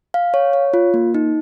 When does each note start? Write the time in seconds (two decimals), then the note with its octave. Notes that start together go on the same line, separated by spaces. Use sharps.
0.14 F5
0.34 C#5
0.53 C#5
0.74 F4
0.94 A#3
1.15 D#4